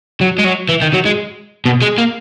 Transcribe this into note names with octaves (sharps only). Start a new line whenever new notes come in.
F#3
G#3
F#3
E3
D#3
F#3
G#3
B2
G#3
A#3